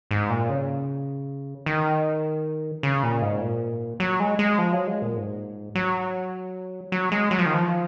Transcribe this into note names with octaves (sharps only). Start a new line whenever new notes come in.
G#2
A#2
C#3
D#3
C#3
A#2
G#2
A#2
F#3
G#3
G#3
F3
F#3
G#3
A#2
G#2
F#3
F#3
G#3
F#3
F3
D#3
F3